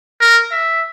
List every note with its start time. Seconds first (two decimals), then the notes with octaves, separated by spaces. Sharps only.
0.20 A#4
0.51 E5